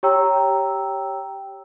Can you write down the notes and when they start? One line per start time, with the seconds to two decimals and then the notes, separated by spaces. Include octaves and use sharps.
0.03 G4 C#5 G5 A#5 E6